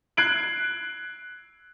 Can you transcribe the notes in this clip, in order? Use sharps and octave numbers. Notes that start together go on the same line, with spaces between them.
F#6 G#6 C7 D7 F#7